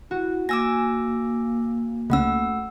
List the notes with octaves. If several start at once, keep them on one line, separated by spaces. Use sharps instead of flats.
E4 F#4
A#3 G#5 D6 E6 A#6 E7
C#2 A3 C#4 F#5 E6